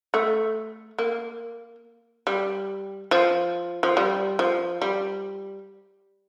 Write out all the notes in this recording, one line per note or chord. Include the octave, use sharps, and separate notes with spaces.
A3
A#3
G3
F3
F3
G3
F3
G3